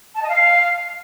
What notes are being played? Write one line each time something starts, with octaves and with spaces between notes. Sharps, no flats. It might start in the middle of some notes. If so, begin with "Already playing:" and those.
A5
D#5
F5